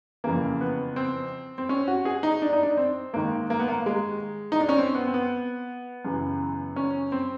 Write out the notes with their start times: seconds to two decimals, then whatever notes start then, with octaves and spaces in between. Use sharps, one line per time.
0.24 F2 C#3 E3 A#3
0.61 B3
0.96 C4
1.58 C4
1.69 C#4
1.88 F#4
2.05 G#4
2.23 D#4
2.42 D4
2.53 D#4
2.63 D4
2.77 C4
3.14 G#2 D#3 A#3
3.50 A#3
3.59 B3
3.68 A#3
3.86 G#3
4.52 D#4
4.60 D4
4.69 C#4
4.78 C4
4.95 B3
5.07 C4
5.14 B3
6.05 F#2 C#3 E3
6.76 C#4
7.12 C4